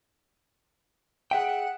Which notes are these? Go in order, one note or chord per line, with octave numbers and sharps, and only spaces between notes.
G#4 E5 F#5 G5